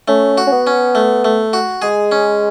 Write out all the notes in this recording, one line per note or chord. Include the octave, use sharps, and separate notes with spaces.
A3 C#4
F#4
C#4
B3
C#4
A3
A3
F#4
G#3 G#4
C#4